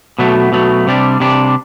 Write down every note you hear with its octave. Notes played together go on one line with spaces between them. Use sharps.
B2 F#3 A3
B2 F#3 A3
C3 G3 D4
C3 G3 D4